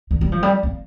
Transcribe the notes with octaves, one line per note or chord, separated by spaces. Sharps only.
D3
G3
F3
G3
A#3